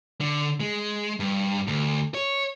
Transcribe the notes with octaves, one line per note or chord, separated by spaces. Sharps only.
D3
G#3
G2
D2
C#5